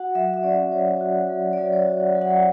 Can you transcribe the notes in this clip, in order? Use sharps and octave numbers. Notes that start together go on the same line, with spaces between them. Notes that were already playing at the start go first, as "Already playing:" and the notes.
Already playing: F#4 F#5
F#3 E5
E5
C#4 D5
F#3 C#5
F#4
F#3
D5
F#3 C#5
C#5
D5
F#4
F#5
F#3
F#5